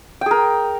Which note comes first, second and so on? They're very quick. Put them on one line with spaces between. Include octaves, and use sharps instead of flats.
G5 G#4 A#4